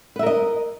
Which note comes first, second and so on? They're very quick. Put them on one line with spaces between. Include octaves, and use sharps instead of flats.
B4 E5 A#4 D#5